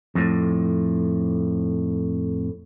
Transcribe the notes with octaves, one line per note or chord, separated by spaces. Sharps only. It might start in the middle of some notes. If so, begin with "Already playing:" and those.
F2 A2